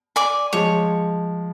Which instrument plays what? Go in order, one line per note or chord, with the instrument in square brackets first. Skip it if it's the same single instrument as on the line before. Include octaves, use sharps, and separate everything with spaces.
[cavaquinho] D5 G#5 D6
[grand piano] F3 G#3 [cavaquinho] C#5